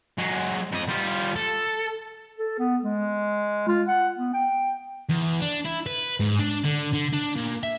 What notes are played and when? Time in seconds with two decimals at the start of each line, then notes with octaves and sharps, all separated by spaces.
0.18 F#3 G#3
0.72 F2 D#5
0.89 G3 F4
1.36 A4
2.38 A4
2.59 B3
2.83 G#3
3.68 F4
3.88 F#5
4.18 B3
4.34 G5
5.10 E2
5.42 D4
5.65 E4
5.86 B4
6.20 G#2
6.39 D4
6.64 D3
6.93 D3
7.13 D4
7.36 A#2
7.63 E5